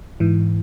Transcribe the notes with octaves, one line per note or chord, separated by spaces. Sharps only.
G#2 E3